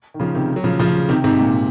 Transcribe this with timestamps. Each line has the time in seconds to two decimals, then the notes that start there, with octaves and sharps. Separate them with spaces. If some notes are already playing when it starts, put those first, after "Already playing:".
0.14 D#3
0.19 C#3 F3
0.34 C3 D#3
0.56 F#3
0.64 C#3 F3
0.79 C#3 F3
1.09 C3 D#3
1.24 G#2 C3
1.39 A#2